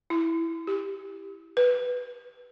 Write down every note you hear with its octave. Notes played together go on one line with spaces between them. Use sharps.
E4
G4
B4